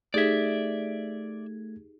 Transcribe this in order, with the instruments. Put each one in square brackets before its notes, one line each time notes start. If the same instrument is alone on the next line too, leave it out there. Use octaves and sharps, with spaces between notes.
[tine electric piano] A3 G#6 [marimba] D#4 G4 G#4 [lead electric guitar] D5 E5